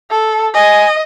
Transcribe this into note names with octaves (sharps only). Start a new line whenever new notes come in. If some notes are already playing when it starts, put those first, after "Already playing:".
A4
D#5 G#5